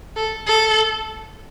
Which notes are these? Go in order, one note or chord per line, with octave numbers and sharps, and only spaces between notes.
A4
A4